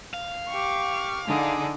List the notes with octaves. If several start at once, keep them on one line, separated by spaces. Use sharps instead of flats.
F5
G4 C#6
D3 D4 D#4 G#4